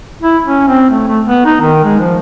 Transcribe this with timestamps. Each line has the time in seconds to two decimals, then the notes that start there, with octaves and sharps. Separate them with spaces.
0.22 E4
0.45 C#4
0.67 C4
0.90 A3
1.08 A3
1.27 B3
1.45 D#4
1.61 D#3
1.84 G#3
2.00 F3